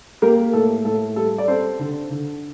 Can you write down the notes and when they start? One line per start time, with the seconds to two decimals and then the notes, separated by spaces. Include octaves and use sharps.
0.22 A#3 G4 A#4
0.53 A2 A4
0.85 A2 A4
1.16 G3 A4
1.38 D5
1.48 C4 A4 C5
1.79 D3
2.10 D3